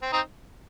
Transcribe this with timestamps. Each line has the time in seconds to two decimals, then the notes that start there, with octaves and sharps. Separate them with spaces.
0.02 C4
0.13 C4 D#4